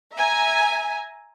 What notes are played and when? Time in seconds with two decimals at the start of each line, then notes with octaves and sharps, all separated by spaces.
0.16 E5 G#5 A#5